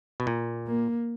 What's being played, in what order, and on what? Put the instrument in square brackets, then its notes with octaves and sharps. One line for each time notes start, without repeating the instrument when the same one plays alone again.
[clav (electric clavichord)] B2
A#2
[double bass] A#3